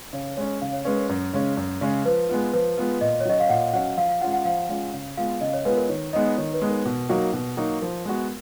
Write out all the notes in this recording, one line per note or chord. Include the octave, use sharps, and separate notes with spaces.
C#3 C#5
G#3 C#4 C#5
C#3 F5
C#5
G#3 C#4 B4
A#4
F#2
C#3 G#3 C#4
F#2
C#3 G#3 C#4
F3 B4
G#3 B3 F4
F3 B4
G#3 B3 F4
A#2 D#5
C#5
F#3 C#4 F#4 D#5
F5
A#2 F#5
F#3 C#4 F#4 F#5
F3 F5
F5
G#3 C#4 F4 F#5
F#5
F3 F5
G#3 C#4 F4
C#3
G#3 B3 F4 F5
C#3 D#5
C#5
G#3 B3 F4 B4
A#4
D#3 C#5
G#3 B3 D#4 D#5
D#3 C#5
B4
G#3 B3 D#4
A#4
B2
F#3 A#3 D#4 F#4
B2
F#3 A#3 D#4 F#4
F3 A#4
G#3 B3 F#4